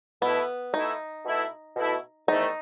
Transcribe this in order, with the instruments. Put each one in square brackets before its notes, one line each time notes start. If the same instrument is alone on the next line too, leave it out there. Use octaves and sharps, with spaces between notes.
[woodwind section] B2 A3 E4 [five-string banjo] B3
[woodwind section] B2 A3 E4 [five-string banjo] D#4
[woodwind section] B2 A3 E4
B2 A3 E4
[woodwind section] E2 D#3 A3 C4 [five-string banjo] D#4